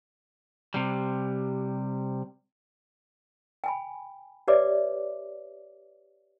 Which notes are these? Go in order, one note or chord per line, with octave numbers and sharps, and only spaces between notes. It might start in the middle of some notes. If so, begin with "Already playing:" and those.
C3 G3
G5 G#5 B5
G4 B4 C#5 D5 E5 D6